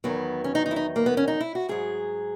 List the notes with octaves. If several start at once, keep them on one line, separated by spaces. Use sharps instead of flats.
E2 D#3 F#3 B3
C#4
D#4
D#4
E4
D#4
A#3
B3
C#4
D#4
E4
F#4
G#2 F#3 G#4